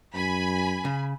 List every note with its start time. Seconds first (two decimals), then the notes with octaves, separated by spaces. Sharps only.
0.15 F#2 G#5 B5
0.85 C#3